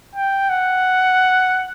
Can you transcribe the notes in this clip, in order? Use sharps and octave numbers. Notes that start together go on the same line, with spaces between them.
G5
F#5